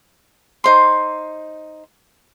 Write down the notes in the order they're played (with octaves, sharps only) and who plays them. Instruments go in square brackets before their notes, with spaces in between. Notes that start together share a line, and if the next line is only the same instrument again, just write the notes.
[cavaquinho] D#4 C5 C6